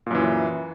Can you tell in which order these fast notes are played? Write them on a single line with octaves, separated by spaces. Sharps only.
A#2 F#2 E3